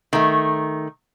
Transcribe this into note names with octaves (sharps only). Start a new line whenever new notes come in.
D#3 A3